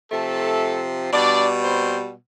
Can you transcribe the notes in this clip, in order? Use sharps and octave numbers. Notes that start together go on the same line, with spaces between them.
C3 F3 A3 A4
B2 G3 D4 D5
C4 C5